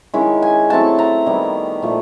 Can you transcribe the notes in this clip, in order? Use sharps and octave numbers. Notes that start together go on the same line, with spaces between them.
D#3 G#3 C#4 E4
G#5
F#3 A3 C4 E4 A5
A#5
D#3 G3 B3 E4
A#2 F3 A3